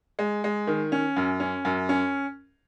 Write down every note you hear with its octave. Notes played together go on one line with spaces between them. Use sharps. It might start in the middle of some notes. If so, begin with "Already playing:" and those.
G#3
G#3
D#3
C#4
F#2
C#4
F#2
C#4